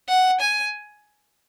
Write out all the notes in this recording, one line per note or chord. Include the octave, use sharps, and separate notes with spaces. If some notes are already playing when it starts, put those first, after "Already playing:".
F#5
G#5